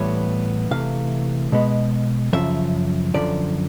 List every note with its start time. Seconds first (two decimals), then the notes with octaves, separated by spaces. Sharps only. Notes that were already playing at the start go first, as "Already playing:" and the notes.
Already playing: A2 E3 G3 B3 C#5
0.71 C3 E3 A3 F5
1.52 B2 G#3 B3
2.33 F#2 C#3 F3 E5
3.14 F#2 D3 F3 D5